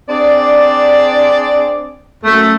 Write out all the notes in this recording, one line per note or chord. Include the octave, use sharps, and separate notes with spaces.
C4 D4 G#4 D5
F#2 A3